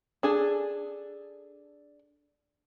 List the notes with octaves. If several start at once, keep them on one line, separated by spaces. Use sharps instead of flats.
D4 G#4 A4